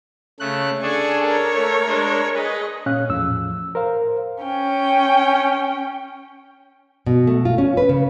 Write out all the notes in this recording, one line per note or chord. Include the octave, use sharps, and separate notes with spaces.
C#3 A3 F#6
D4 G#4 A4 G#5 C#6
A#4 C#5
A3
G#3 D4
G#4 B4 D#5
A#2 C#4 F5 F#6
E2 A2 F3 E6
A#4 C5 F5
C#4 G5
B2
A3
F4
C#4
B4
C#3